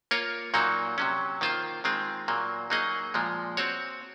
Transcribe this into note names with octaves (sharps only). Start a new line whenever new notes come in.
A#3 F4 A#4 C#5
A#2 F#3 A#3 D#4 F#4
C3 F#3 C#4
D#3 A#3 F4 C5
D#3 G#3 C4 F4
A#2 F#3 A#3
F#3 A#3 D#4 G#4 D#5
A#2 F3 G#3
C4 F#4 C#5